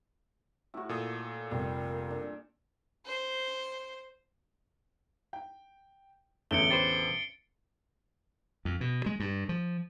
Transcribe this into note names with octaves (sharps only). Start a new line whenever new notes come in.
A2 E4 F#4 C#6
A#2 A4 D#6
F1 G3 A#4
D4
C5
G5
A1 E2 D3 A3 C#7 D7 G7
G4 B4 C5 A6 C7
F2
B2
G#3
G2
F3